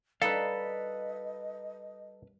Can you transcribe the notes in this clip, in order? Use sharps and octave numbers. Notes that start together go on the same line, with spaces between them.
G3 D#4 A4 B4 D#5 F5